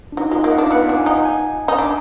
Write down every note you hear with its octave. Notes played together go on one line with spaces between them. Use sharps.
D4
F#3 D#4
G#3 F4
A#3 D#5
F#5
D4 F5
B3 F#5
D4
G#5
D#4
G#5
D#4
D4 A#5